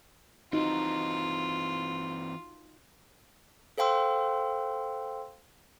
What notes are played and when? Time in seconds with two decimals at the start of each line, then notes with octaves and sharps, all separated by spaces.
0.53 E3 C4 D#4 F4 F#4
3.78 A4 C5 F5 G5 C6 E6